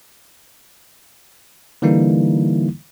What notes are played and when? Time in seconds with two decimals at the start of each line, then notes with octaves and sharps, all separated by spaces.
1.82 D3 E3 G3 A#3 D#4 E4